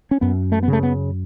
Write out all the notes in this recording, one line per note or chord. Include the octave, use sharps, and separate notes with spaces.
C#4
F#2 B3
A3
B3
C#3 A3
B3